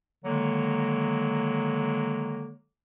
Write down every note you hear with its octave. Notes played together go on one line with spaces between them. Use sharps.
D3 D#3 F#3 G#3 A#3